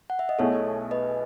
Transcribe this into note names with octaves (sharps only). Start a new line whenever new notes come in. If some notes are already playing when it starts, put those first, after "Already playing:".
F#5
E5
D#5
B1 B2 A3 E4 G#4 A4 C#5
B4 D#5